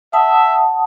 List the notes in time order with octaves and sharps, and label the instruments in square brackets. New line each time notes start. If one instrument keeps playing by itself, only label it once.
[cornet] E5 [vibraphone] F#5 A5 D#6